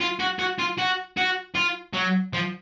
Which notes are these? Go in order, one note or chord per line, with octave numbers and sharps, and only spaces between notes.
F4
F#4
F#4
F4
F#4
F#4
F4
F#3
F3